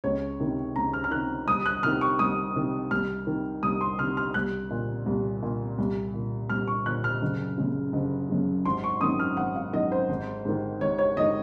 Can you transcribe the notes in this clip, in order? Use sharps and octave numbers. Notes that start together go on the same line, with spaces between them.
C#2 C#5
C3 D#3
C#2 A#5
F6
F6
C3 D#3 F#6
C2 D#6
F#6
C3 D#3 F6
C#6
C2 D#6
C3 D#3
C2 F6
C3 D#3
C2 D#6
C6
C3 D#3 F6
F6
C2 F#6
A#2
C2
A#2
C2
A#2
C2 F6
C#6
A#2 F#6
F6
F#1
F#2 C#3
F#1
F#2 C#3
G#1 C6
C#6
F#2 D#3 D#6
F6
G#1 F#5
F5
F#2 D#3 D#5
C5
G#1
G#2 D#3
G#1 C#5
C#5
G#2 D#3 D#5